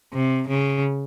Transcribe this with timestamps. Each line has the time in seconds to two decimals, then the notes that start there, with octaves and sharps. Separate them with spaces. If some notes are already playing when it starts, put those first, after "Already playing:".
0.13 C3
0.48 C#3